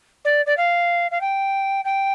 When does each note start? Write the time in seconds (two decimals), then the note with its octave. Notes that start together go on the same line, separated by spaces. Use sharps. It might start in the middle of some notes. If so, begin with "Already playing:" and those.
0.24 D5
0.46 D5
0.57 F5
1.11 F5
1.20 G5
1.84 G5